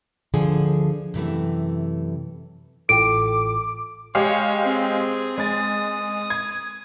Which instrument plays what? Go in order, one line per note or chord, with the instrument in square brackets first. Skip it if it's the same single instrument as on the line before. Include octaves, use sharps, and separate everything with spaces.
[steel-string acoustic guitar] D2 D3 F3 G#4 G#5
F#2 C3 E3 A3
[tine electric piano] A1 A2 F4 [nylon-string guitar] A4 G5 [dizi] D6 [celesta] D7
[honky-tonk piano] G#3 G4 F5 [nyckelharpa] C#5
[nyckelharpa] C4 G#4
[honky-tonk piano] G#3 A6 [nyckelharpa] D#6
[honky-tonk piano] G#6